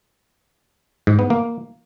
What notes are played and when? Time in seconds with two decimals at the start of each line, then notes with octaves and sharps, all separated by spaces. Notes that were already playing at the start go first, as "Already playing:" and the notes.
1.07 G#2
1.19 B3
1.30 A#3